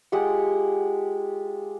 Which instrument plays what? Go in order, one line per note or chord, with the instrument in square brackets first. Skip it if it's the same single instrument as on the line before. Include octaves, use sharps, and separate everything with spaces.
[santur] G#3 F4 G4 F#5